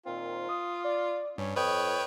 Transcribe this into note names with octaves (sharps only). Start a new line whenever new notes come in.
A#2 D#3 C4 F4
D#6
D5
G2 C#4
F2 B4 C#5 D#5 G5